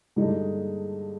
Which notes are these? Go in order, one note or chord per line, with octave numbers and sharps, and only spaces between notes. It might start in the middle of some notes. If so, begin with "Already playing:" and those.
G2 D3 G#3 D#4